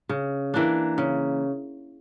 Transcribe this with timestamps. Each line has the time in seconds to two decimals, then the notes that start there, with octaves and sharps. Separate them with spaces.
0.09 C#3
0.54 E3 A#3 D4
0.98 C#3